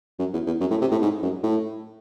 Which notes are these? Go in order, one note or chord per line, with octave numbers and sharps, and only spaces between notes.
F#2
E2
E2
F#2
A2
C3
A2
G#2
F#2
A2